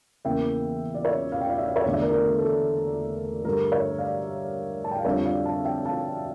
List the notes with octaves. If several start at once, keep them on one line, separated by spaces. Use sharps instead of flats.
E2 C#3 E3 A#3 E5 G5
D5
C#5 E5
F5
G5
D5 F5
E5
F5
C#5 E5
E2 D3 A3 D5
E5
A#4 D5
A#4
A4
A4
G2 D3 A3 A#4
C#5 E5
D5 F5
A5
G5
F5
F2 D3 G3 D4 F4 C#5 E5
D5 F5
F5 A5
E5 G5
F5 A5